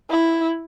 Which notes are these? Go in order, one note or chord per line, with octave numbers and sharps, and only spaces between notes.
E4